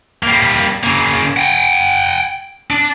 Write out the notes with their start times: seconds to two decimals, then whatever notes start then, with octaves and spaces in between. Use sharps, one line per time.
0.23 G3 A#3
0.84 C#3 A#3
1.37 F#5 G5
2.71 D4